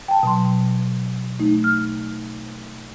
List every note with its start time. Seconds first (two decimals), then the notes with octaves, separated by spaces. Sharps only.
0.08 G5 A5
0.23 B2 F#3 C6
1.40 A3 D#4
1.64 F6